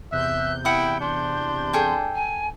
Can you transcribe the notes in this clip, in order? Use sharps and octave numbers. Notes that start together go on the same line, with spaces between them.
E2 C3 E5 F#6 G6
E4 F#5 G5 D#6
D4 C6
G#4 A4 G5
G#5